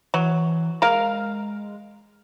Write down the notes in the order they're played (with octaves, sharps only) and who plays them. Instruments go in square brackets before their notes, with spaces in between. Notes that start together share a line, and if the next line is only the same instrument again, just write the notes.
[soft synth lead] E3 [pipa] F#3
[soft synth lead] G#3 [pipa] A#4 F5